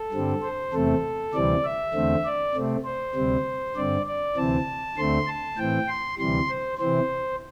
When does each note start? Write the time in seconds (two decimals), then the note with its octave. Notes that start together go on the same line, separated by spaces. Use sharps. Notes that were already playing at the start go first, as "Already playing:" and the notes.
Already playing: A4
0.12 G2 D3 G3 C4
0.43 C5
0.73 E2 C3 A3 C4 A4
1.33 D2 C3 E3 G3 C4 D5
1.65 E5
1.94 E2 D3 A3 C4
2.25 D5
2.55 C3 A3 C4
2.85 C5
3.15 D2 C3 G3 C4
3.76 G2 D3 C4 D5
4.06 D5
4.36 D2 C3 E3 C4 A5
4.97 D2 D3 A3 C4 C6
5.27 A5
5.57 A2 E3 C4 G5
5.88 C6
6.18 D2 C3 E3 G3 C6
6.49 C5
6.78 C3 E3 C4 C5